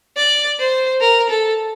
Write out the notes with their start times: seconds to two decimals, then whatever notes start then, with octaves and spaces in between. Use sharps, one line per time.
0.17 D5
0.59 C5
1.01 A#4
1.30 A4